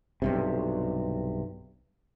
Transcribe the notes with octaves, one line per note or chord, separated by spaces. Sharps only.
B1 G2 C3